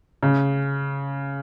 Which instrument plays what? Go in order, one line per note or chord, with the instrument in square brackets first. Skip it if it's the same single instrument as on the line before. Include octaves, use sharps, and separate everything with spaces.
[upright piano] C#3